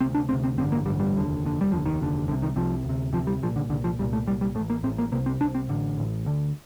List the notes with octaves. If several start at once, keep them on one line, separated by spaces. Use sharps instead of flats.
D2 C3 C4
D4
D2 C3 C4
C4
A1 G2 D3 C4
A#3
A1 G2 D3 G3
G3
F1 D#2 D3
F1 D#2 D3
G3
F1 D#2 D3 F3
D#3
F1 D#2 D3
C2 C3 D3
D#3
C2 C3 F3
D2 C3
D2 C3 F3
G3
C2 A#2 F3
D3
C2 A#2 D3
F3
C2 A#2 G3
A3
C2 A#2 G3
G3
A2 A3
A1
A#3
A1 A2 C4
A#3
C2 C3 A#3
C4
C2 C3 D4
C4
A1 A2 D3
A1 A2
D2 D3